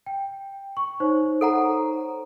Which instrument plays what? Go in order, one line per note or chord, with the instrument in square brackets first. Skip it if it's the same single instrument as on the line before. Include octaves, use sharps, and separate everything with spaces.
[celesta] G5
C#6
D#4 C5 C#5
[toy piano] A4 F#5 A#5